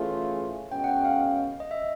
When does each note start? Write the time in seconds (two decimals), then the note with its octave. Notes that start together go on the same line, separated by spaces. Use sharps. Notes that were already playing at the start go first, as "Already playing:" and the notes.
Already playing: E3 A3 C#4 F4 G#4
0.71 B2 G#3 C#4 G5
0.84 F#5
0.88 G5
1.05 F5
1.60 D#5
1.71 E5